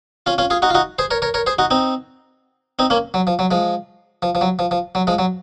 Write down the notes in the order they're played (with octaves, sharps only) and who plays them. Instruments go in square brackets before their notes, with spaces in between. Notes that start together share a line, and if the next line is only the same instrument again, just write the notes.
[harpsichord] C#4 F4
C#4 F4
F4 G#4
D#4 F#4
F4
D#4 F#4
G#4 C5
A#4 C#5
A#4 C#5
A#4 C#5
G#4 C5
D#4 F#4
C4 D#4
C4 D#4
A#3 C#4
F#3
F3
F#3
F3 G#3
F3
F3
F#3
F3
F3
F#3
F3 G#3
F#3